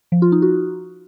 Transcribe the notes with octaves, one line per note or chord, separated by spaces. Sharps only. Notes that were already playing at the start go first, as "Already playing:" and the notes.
F3
F4
D#4
F#4